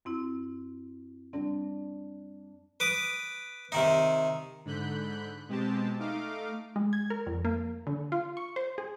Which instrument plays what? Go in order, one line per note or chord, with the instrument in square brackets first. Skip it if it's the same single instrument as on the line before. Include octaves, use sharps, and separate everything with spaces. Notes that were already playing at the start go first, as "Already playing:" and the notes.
[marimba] F#2 C4 E4
[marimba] G3 C4 [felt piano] D4
[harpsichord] B4 D6 D#6
C3 D#3 D#4
[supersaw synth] G#2 D3 B5 F#6 G6
B2 G#3 C4 G4 A5
A3 D#4 F5 D6
[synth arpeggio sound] G#3
G#6
A#4
F2
A#3
D3
F4
C#6
C5
G#4